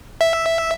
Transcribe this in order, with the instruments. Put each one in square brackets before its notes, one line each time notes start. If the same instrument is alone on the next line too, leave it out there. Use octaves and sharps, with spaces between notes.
[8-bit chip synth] E5